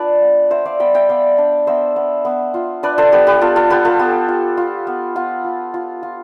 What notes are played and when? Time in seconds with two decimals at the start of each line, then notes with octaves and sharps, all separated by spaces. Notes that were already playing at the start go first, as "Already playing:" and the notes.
Already playing: D4 F4 B4 D5 G5 A5 B5
0.22 B3
0.50 B3 C5 E5
0.66 D5 F5
0.80 B3 G5 B5
0.94 E5 G5
1.09 B3 D5 F5
1.38 D4
1.67 B3 C5 E5
1.96 B3
2.25 B3
2.54 F4
2.83 D4 B4 D5
2.98 A4 C5
3.12 B3 G4 B4
3.27 G4 B4
3.41 B3 F4 A4
3.56 F4 A4
3.70 B3 G4 B4
3.85 F4 A4
3.99 B3 G4
4.28 F4
4.57 F4
4.87 B3
5.15 B3 F4
5.44 F4
5.74 F4
6.03 F4